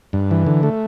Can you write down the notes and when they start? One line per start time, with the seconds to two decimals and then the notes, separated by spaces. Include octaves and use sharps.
0.13 G2
0.31 E3
0.46 D3
0.63 A3